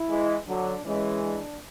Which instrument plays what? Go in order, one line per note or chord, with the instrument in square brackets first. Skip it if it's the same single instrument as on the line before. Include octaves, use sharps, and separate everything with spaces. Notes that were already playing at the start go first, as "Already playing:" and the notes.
Already playing: [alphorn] E4
[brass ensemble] E3 G#3
[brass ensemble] D3 F#3 [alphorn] D4
[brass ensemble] E3 G#3 [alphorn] C#4
[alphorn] D4